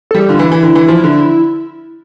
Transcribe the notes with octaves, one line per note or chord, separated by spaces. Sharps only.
G3 A4
G4
D3 F4
E3 E4
E3
D3
E3
F3
D3